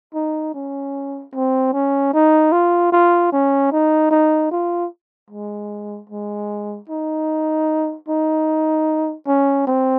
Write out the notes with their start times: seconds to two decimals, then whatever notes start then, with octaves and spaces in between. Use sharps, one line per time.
0.14 D#4
0.54 C#4
1.34 C4
1.73 C#4
2.13 D#4
2.52 F4
2.92 F4
3.32 C#4
3.72 D#4
4.11 D#4
4.51 F4
5.30 G#3
6.09 G#3
6.89 D#4
8.08 D#4
9.27 C#4
9.67 C4